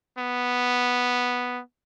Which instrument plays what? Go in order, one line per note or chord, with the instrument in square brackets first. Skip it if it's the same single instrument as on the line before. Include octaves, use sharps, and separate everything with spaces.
[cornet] B3